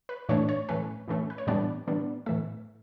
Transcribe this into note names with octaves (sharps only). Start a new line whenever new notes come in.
B4
A2 E3 A3 D4 C#5
C#5
A2 E3 A3 C#4 B4
A2 E3 A3 C#4
B4
C#5
A2 E3 G3 B3 D4 D5
A2 E3 G3 B3 D4
A2 E3 A3 E5